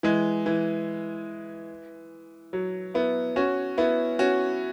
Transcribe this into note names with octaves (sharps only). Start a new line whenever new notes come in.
E3 G#3
E3
F#3
B3 E4
C#4 F#4
B3 E4
C#4 F#4